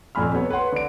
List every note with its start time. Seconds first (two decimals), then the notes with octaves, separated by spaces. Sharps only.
0.15 D#1 F2 G#5 B5 F6
0.34 C3 B3 C#5
0.50 B4 C#5 F#5 C6
0.72 D3 D7